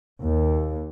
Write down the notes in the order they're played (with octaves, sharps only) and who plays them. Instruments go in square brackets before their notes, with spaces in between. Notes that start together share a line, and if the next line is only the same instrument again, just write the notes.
[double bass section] D#2